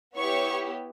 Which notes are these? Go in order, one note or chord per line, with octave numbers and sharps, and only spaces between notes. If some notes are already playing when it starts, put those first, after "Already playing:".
B3 E4 G4 C#5 C#6